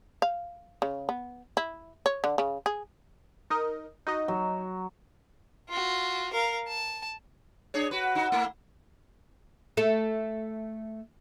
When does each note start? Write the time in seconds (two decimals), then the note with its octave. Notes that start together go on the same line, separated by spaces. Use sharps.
0.22 F5
0.82 C#3
1.09 B3
1.57 E4
2.06 C#5
2.24 D3
2.38 C#3
2.66 G#4
3.50 D#4 A#4 D#5
4.07 D#4 F#4 D#5
4.28 F#3
5.69 F4 F#4
6.33 A#4 F5
6.67 A5
7.74 D4 G#4 C#5
7.91 F#4 B4
8.15 D#4 F#4
8.32 A3 A#3 E4
9.77 A3 A4